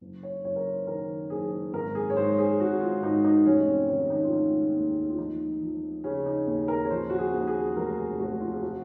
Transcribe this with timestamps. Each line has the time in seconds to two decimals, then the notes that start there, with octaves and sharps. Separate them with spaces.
0.01 F#1
0.23 C#5
0.44 F#1 C#5
0.56 A#4
0.66 C5
0.87 D#3 A#4
1.30 F#1 G#4
1.73 G#1 A#4
1.95 G#4
2.10 C#5
2.17 G#2 C5
2.38 G#4
2.60 G#1 F#4
2.81 F4
3.03 G#2 D#4
3.24 D#4
3.46 F1 C#4
3.67 C4
3.89 D#3 C#4
4.10 D#4
4.24 F4
4.32 F1 D#4
4.75 D#2
5.09 F4
5.18 F3 D#4
5.61 F3
6.04 C#3 C#4
6.26 D#4
6.47 D#2
6.68 A#4
6.85 C#5
6.90 F3 C5
7.10 F#4
7.19 G#4
7.33 D#2
7.47 G#4
7.76 F1 A#4
7.98 G#4
8.19 F1 F#4
8.41 F4
8.53 G#4
8.62 F#4